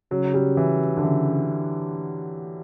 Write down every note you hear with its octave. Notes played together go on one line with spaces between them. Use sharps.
C#3 F#3
G3
E3
D3
C#3 E3